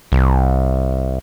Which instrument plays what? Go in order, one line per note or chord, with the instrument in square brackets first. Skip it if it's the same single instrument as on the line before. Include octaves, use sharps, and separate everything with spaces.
[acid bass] C2